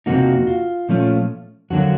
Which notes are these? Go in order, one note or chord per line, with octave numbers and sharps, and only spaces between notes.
F2 C3 F3 A#3 D#4 F#4
F4
A#2 F3 A3 C#4 F4
F2 D3 F#3 A#3 F#4